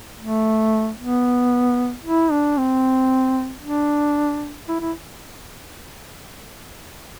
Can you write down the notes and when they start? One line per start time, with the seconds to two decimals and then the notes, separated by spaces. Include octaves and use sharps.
0.20 A3
0.99 B3
2.04 E4
2.31 D4
2.58 C4
3.62 D4
4.69 E4
4.81 E4